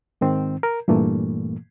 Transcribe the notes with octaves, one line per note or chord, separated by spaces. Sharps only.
G#2 D#3 C4
A#4
G2 A#2 E3 A3 A#3